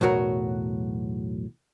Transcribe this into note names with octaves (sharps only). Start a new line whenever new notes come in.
B1 E2 A2 F#3 F#4 A#4